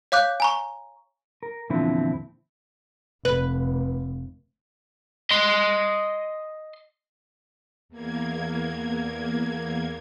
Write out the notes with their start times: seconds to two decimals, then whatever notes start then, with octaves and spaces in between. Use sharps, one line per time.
0.12 C#5 F5 D6 F#6 G6
0.40 G#5 A#5 C#6
1.43 A#4
1.70 E2 A#2 D3 F3 C4 E4
3.25 F1 B4
5.31 D#5 C6
7.89 E2 A#3 G#6